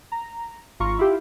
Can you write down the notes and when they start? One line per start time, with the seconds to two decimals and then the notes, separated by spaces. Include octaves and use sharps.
0.12 A#5
0.80 G#1 F4 A#5 C#6
0.99 E4 F4 G4